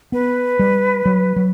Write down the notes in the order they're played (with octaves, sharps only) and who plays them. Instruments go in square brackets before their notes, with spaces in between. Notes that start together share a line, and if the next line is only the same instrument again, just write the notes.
[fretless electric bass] B3 [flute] B4
[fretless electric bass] G3
F#3
F#3